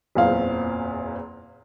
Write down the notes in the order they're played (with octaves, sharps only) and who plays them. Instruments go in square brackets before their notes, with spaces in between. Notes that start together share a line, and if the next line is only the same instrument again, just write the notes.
[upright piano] F#1 E2 A#2 C4 F5